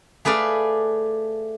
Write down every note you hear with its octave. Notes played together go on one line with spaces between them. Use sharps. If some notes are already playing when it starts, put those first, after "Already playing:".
A3 G#4 B4 D5 F5